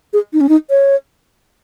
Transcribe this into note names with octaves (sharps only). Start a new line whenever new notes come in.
G#4
D#4
C#4
D#4
C#5